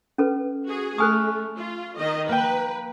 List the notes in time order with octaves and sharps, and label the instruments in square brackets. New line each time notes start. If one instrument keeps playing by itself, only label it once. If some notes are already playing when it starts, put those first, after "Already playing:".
[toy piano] C#4 A4 B4
[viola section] F#4 G#4
[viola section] A3 [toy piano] A4 G#5 D#6 [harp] C#6 F6 F#6
[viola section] F4
D#3 D#5
[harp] A#3 G5 [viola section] B4